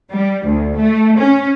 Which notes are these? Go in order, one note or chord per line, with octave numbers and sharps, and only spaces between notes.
G3
D2
A3
C#4